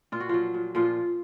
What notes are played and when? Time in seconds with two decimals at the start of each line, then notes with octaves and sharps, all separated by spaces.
0.12 A#2 F4
0.20 F#4
0.29 F3 F#3 F4
0.54 A#2
0.75 A#2 F3 F4